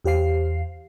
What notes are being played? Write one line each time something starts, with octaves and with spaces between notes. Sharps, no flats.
E2 G4 C5 F5 C7